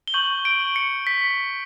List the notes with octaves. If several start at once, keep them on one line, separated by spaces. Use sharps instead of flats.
G7
C#6 G6 F#7
D7
C#7
B6